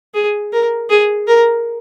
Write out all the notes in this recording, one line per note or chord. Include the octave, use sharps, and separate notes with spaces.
G#4
A#4
G#4
A#4